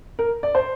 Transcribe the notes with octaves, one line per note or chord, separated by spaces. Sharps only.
A#4
D5
C5